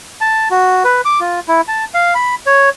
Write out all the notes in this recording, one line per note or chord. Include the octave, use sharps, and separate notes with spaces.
A5
F#4
B4
D6
F4
E4
A5
F5
B5
C#5